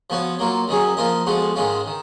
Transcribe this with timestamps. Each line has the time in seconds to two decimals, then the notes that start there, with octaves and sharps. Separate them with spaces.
0.10 F3 B3 F#4 C#5
0.39 F#3 A#3 F4
0.68 F#2 D#3 F#3 C#4 G#4
0.97 F3 A#3 F4 A#4 D#5
1.27 F2 F3 G#3 B3 F#4
1.56 G#2 D#3 G#3 C#4 F4
1.86 D#3